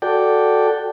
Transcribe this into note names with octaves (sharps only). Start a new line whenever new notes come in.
F#4 A4 D5 G5